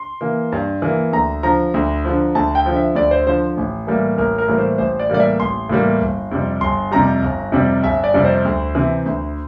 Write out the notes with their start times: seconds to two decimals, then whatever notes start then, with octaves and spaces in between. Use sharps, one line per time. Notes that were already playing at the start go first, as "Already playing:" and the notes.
Already playing: C6
0.21 E3 A#3
0.52 G2
0.82 E3 A#3
1.12 D2 A#5
1.43 D3 F3 A#5
1.74 D2
2.05 D3 F3
2.35 D2 A5
2.55 G5
2.66 D3 F3
2.76 E5
2.95 D2 D5
3.11 C5
3.27 D3 F3 C5
3.57 A1
3.87 A2 E3 G3 A#3
4.17 A1 A#4
4.38 A#4
4.48 A2 E3 G3 A#3
4.58 C5
4.78 A1 C5
4.99 D5
5.10 A2 E3 G3 A#3 D5
5.20 E5
5.40 A1 C6
5.69 A2 E3 G3 A#3
6.01 G1
6.31 F2 C3 G3
6.61 G1 C6
6.91 F2 C3 G3 A#5
7.22 G1
7.52 F2 C3 G3
7.84 G1 E5
8.04 D5
8.14 F2 C3 G3
8.25 C5
8.45 D2
8.75 C3 E3
9.06 D2